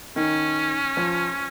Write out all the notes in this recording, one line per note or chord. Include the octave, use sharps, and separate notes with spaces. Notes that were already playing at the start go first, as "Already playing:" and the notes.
D#3 C#4
F3